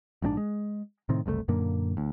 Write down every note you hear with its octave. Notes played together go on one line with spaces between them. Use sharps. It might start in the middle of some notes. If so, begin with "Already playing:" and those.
A#1 G#2 C4 D4
G#3
A2 C3 D#3 C4
F#1 C2 A2 A3
F#2 A#2 D3 A#3
D2